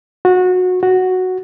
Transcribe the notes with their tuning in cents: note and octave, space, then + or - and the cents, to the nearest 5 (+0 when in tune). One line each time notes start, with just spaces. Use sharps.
F#4 -20
F#4 +0